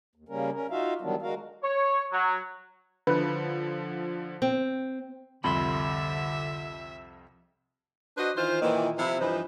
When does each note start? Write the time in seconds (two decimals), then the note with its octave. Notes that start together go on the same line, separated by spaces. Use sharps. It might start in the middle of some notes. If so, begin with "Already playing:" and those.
0.15 D#2
0.29 C#3 G3 A#3 C#4 A#4
0.54 C#4 A#4
0.70 D#4 F4 F#4 E5 F5
1.01 D#3 E3 F#3 G3 B3 D4
1.22 G#3 F#4 A#4 F5
1.63 C#5
2.12 F#3
3.07 D3 F3 B4
4.42 C4
5.44 C2 F2 D3 E5 B5 C6
8.17 D4 F#4 B4 C5 D#5
8.36 D#3 E3 F4 C5
8.61 A#2 D#3 E3
8.99 C3 F3 E4
9.20 G2 E3 F3 D#4 B4 C5